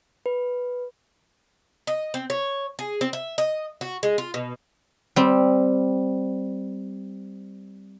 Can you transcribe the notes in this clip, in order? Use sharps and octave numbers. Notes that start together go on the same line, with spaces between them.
B4
D#5
C4
C#5
G#4
C4
E5
D#5
F#4
G#3
F4
B2
G3 C4